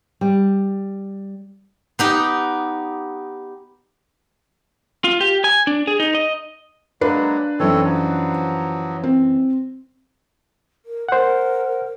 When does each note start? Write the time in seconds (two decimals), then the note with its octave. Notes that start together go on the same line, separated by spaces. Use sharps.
0.21 G3
1.99 B3 D#4 G4
5.04 F4
5.21 G4
5.44 G#5
5.67 D4
5.87 G#4
6.00 D#4
6.15 D#5
7.01 F#3 G#3 A#3 D4 B4
7.60 F#2 E3 C4 A4 C#5
7.84 F3 F#3
9.04 C4
10.86 A#4
11.09 A#4 C5 F#5